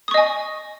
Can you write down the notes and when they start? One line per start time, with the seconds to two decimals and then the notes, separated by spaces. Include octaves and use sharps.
0.08 D#6
0.11 C#6
0.14 D#5
0.17 G#5